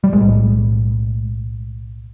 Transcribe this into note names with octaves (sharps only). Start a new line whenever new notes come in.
G3
B1 A2 G#3